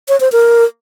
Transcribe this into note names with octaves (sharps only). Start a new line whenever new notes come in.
C#5
C5
A#4